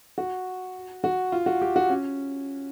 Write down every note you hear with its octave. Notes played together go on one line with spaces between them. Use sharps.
F#4
F#4
F4
F#4
G4
F#4
C#4